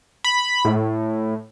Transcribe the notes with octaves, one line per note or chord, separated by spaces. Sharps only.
B5
A2